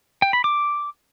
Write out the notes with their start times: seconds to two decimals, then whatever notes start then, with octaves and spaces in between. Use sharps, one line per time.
0.22 G5
0.33 B5
0.44 D6